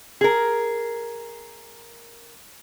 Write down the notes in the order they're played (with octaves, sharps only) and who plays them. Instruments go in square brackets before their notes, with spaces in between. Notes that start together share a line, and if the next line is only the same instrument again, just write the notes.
[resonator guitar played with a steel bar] G#4 A#4